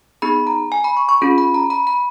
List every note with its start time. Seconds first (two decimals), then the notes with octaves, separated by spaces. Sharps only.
0.22 B3 D#4 G#4 B5
0.47 A#5
0.72 G#5
0.84 B5
0.97 C#6
1.09 C#6
1.21 C#4 F4 G#4 B5
1.38 B5
1.54 A#5
1.70 B5
1.87 B5